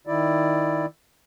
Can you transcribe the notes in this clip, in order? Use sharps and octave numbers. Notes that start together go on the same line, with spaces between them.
D#3 E4 D5